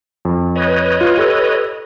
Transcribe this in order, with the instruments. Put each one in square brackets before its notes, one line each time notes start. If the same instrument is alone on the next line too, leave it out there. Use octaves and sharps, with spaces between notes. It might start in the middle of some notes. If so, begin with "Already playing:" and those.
[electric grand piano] F2
[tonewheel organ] B4 C#5 D#5
[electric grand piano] F4
G4 A4 E6